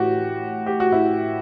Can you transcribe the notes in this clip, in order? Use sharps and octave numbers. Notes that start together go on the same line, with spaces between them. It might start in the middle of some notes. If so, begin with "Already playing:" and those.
Already playing: A2 E3 F#4 G4
G4
F#4
E4